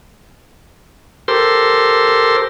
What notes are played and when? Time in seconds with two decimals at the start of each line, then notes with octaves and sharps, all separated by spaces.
1.28 G4 A4 A#4 C5 C6